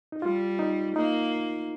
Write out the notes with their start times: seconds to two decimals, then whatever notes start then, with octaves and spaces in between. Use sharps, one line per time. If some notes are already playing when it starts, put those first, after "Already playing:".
0.12 D#4
0.22 G3 F4
0.59 D#4
0.96 A#3 D#4